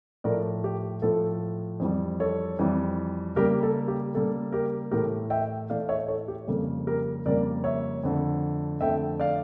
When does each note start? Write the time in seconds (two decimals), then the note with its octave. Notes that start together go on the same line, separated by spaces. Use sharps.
0.24 A2 F3 A3 A#4 D5
0.64 G4
1.02 A2 F3 A3 A4
1.80 F2 E3 G3
2.20 A4 C#5
2.59 F2 E3 G3
3.36 C#3 G3 A#3 G4 A#4
3.63 A4
3.88 G4
4.14 C#3 G3 A#3 A4
4.52 G4 A#4
4.91 A2 E3 A3 G4 A#4
5.30 E5 G5
5.70 A2 E3 A3 D5 F5
5.89 C#5 E5
6.08 A4 C#5
6.28 G4
6.47 F2 C#3 G3 A#3 A4
6.87 G4 A#4
7.26 F2 C#3 G3 A#3 A#4 D5
7.64 C#5 E5
8.04 F2 D3 A3
8.81 F2 D3 A3 E5 G5
9.20 D5 F5